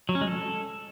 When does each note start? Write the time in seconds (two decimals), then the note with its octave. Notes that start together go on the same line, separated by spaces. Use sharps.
0.09 F#3
0.15 C#4
0.21 G#3
0.27 A4